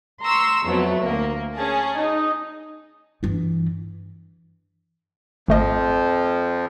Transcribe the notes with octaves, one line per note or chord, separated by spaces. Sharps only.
A#5 C6 C#6 E6
F2 F#3 A3 B3
D2 A#3
C#4 G#4 A5
D#4
G2 E3
G#1 F2 F3 A3 D#5